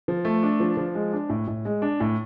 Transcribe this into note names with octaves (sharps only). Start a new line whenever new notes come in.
F3
A3
D4
F3
F3
G#3
D4
A2
A2
G#3
D4
A2